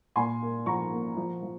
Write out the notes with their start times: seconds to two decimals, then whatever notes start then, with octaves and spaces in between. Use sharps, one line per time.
0.16 A#2 G#5 C6
0.42 A#3
0.66 F3 A#5 C#6
0.91 A#3
1.17 F3
1.42 F3